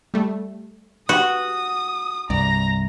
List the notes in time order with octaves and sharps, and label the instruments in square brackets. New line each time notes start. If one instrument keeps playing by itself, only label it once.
[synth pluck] G3 A3
[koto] F#4 [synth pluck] G4 B4 [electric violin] D#6
[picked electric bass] C2 G2 [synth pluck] D5 [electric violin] A#5